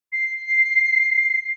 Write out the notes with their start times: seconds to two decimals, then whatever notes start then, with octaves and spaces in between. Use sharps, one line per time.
0.12 C7